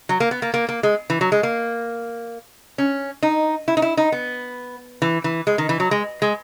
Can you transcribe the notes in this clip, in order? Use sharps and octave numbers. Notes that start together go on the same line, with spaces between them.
F#3
A#3
B3
A#3
A#3
A#3
G#3
E3
F#3
G#3
A#3
C#4
D#4
E4
D#4
E4
D#4
B3
E3
E3
G#3
D#3
E3
F#3
G#3
G#3